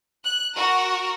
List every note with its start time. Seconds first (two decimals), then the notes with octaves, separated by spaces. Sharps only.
0.25 F#6
0.55 F#4 A#4